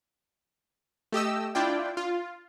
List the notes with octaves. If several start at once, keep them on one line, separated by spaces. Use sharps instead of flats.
A3 G4 D#5 E6
D4 E4 F4 D5 G5
F4